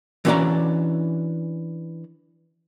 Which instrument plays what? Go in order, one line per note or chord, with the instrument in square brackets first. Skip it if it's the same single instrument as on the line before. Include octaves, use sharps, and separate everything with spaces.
[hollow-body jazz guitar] E3 C#4 D4 F#4 D5 A#5